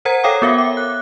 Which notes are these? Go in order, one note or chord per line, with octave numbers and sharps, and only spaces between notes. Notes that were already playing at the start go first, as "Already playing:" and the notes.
A#4 C5 F#5 A#5 G#6
A4 C#5 F5 G5 D6 D#6
B3 F#4 A#4 E5 F5
D6
F#6